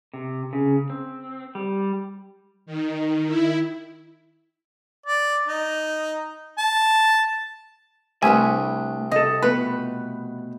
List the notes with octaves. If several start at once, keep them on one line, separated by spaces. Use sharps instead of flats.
C3
C#3
C4
G3
D#3
E4
D5
D#4
A5
C2 A3 D4 B4 C#5 G#5
C3 A4 D#5 F5
B2 F3 A3 B3 B4